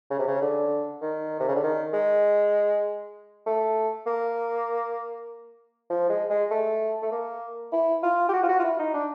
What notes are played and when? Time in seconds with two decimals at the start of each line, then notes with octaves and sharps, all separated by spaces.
0.10 C#3
0.19 C3
0.27 C#3
0.41 D3
1.01 D#3
1.40 C3
1.48 C#3
1.55 D3
1.63 D#3
1.93 G#3
3.46 A3
4.06 A#3
5.90 F3
6.09 G#3
6.30 G#3
6.51 A3
7.02 A3
7.11 A#3
7.72 E4
8.03 F4
8.29 G4
8.33 F#4
8.43 F4
8.48 F#4
8.59 F4
8.64 E4
8.79 D#4
8.93 D4